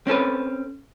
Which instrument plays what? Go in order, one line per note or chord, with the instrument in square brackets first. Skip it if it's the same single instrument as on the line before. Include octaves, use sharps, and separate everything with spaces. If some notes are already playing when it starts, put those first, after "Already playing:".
[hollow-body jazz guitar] C4 C#4 A4 B4